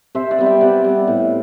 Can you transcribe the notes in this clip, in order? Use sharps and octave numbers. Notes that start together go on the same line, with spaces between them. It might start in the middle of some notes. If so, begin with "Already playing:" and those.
C3 C5 E5
D5 F#5
G3 B3
E5 G5
C3 D5 F#5
G3 B3
A2